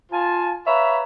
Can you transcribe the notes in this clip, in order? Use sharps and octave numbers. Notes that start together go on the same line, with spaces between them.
F4 G#5 A5
B4 C#5 E5 F5 A#5 B5